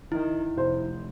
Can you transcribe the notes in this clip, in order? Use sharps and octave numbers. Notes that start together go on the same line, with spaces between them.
D#3 E4
F1 C5